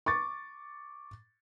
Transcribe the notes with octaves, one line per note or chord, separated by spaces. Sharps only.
C#6 D6 A6